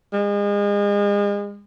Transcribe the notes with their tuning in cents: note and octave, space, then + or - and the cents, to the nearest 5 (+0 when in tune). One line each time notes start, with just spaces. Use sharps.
G#3 -35